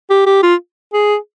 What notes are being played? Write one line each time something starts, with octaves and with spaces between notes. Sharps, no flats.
G4
G4
F4
G#4